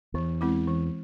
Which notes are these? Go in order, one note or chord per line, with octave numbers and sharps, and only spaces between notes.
E2 E3
G#3 C4 E4
E3